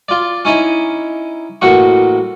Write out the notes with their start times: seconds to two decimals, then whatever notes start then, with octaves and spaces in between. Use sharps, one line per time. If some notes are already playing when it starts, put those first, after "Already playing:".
0.09 F4 D5
0.45 C#4 D#4 E4
1.62 A1 A#3 F#4 C#6